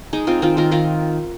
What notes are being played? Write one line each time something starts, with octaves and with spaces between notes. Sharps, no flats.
G#3 D#4
G#3 C4 F4
D#3 C4 F4
D#3 F4 A#4
D#3 F4 A#4